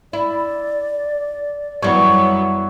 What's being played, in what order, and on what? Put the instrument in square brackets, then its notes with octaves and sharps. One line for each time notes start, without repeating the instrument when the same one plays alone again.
[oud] E4 [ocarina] D5
[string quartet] F#2 F#3 B3 [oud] E3 G3 [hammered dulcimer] C#5